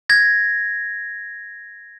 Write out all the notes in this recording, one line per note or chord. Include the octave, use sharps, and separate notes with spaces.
G#6 A#6